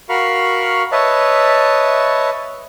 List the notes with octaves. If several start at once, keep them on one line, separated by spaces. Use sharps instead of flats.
F#4 A#4 F5 B5 C#6
B4 C#5 D#5 E5 A5